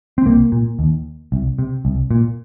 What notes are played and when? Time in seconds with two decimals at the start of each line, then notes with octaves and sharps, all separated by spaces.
0.18 C4
0.25 C2 A#3
0.52 A#2
0.79 D#2
1.32 C2
1.59 C3
1.85 C2
2.11 A#2